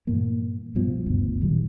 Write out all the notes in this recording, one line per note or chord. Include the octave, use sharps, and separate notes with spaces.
G2 A#2 E3 A#3
C2 G2 B2 F3
F#1 D2 G2 B3
A#2 D#3 F#3 G3